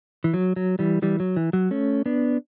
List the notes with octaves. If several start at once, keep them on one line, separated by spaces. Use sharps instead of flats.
E3
F#3
F#3
E3 G3
E3 G3
F#3
E3
F#3
A3 C#4
B3 D4